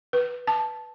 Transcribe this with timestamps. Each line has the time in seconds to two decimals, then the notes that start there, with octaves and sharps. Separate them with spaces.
0.13 B4
0.47 A5